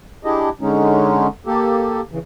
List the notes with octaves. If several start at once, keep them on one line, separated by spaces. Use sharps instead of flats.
D4 E4 G4 G#4 D#5
D3 G#3 C#4 D#4
A#3 G4 A4
C#3 E3